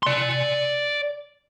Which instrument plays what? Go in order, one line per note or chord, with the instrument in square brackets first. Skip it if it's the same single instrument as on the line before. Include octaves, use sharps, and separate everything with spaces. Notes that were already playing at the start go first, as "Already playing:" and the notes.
[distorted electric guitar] D5 C6